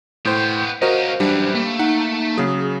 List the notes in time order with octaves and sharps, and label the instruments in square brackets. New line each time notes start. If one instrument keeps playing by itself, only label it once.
[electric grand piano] A2 C5 [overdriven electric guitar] B3 G5
[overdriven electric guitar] C#4 F4 [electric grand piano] F#4 A#4 D#5 [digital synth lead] C5
[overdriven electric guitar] F#2 E3 [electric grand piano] G3 [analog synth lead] D4
[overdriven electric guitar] A3 [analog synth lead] A#3
[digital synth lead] D#4 [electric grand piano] F#5
[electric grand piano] C#3 F#3 [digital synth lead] G#4